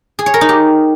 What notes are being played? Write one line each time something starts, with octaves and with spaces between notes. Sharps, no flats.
G#4
C#5
A#4
D#4
G4